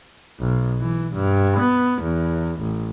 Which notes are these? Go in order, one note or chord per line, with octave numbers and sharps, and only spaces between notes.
B1
E3
G2
B3
E2
A1